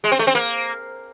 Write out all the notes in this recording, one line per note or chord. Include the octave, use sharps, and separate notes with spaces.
G#3
C4
A3
C4
A#3